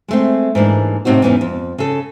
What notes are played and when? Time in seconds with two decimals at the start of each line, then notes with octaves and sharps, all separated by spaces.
0.08 G#3 A3 C4
0.55 G#2 E3 A#3 D4
1.05 A2 C3 C4 D#4 F#4
1.22 E2 G#2 E3 A#3 B3 C#4
1.41 F2
1.78 C#3 A4